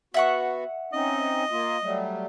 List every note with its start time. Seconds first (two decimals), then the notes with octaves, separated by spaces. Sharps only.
0.14 B3 F#4 E5 F#5 C#6
0.93 C4 C#4 D#4 D#5
1.51 A#3 F4
1.82 F#3 G3 A3